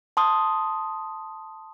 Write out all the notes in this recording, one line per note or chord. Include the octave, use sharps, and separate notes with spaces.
A5 C6 D#6